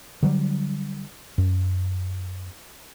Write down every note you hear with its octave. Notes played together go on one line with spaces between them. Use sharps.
D3 F#3 G3
F#2